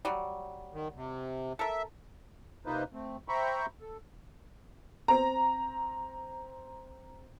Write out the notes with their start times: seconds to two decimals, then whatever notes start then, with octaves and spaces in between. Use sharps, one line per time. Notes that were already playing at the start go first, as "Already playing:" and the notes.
0.05 F#3 G3
0.73 D#3
0.95 C3
1.59 A4 A#4 E5
2.66 C3 A#3 D#4 F4 B4 C5
2.93 A3 C4
3.28 C5 E5 G5 A#5 B5 C#6
3.81 A4
5.08 C4 A#5